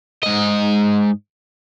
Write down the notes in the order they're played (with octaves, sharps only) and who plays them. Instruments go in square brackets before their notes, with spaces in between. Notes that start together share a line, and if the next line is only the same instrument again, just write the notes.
[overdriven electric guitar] G#2 D#5